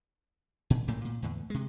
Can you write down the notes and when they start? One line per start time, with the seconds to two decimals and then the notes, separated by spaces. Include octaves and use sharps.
0.70 A#2
0.88 A1 A2 A3 A#3
1.05 A#2
1.22 E2 A2 D3
1.50 C3 G#3